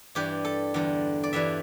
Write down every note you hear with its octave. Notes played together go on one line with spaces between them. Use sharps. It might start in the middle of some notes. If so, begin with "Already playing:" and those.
G2 E3 G3 G4
A4
E2 D3 G3
D5
G2 E3 G3 E5